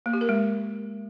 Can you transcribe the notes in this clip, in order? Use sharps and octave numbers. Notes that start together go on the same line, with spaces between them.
A#3
G4
A#4
G#3